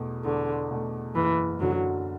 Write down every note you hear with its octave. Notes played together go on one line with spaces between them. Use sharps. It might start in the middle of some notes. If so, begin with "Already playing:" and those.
Already playing: E2 B2 A3
E2 D3
B2 A3
F#1 E3
F#2 D3 F#3